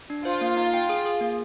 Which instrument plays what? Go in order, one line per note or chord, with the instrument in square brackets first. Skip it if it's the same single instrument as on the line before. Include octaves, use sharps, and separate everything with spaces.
[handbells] D4
[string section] F4 [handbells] C5
[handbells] A#3
D#4
G5
G#4
G#4
A#3